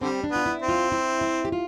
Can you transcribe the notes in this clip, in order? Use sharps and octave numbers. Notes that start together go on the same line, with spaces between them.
D3 G3 C4
D4
B3 F4
E4
C4
F4
E4
E4
G4
F4